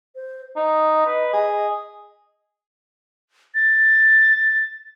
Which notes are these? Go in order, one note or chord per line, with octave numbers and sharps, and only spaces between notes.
C5
D#4 D#5
B4
G#4
A6